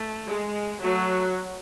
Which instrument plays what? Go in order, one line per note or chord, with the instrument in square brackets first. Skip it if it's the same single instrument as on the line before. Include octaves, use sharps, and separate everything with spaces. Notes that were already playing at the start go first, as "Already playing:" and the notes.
Already playing: [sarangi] A3
[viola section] G#3
[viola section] F#3 [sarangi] A3